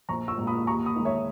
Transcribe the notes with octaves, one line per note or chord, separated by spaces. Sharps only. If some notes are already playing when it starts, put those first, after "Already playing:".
A#1 A#5 C#6
C#6 E6
A#2 G#3
B5 D#6
D#2 A#5 C#6
B5 D#6
D#3 G#3
C#5 E5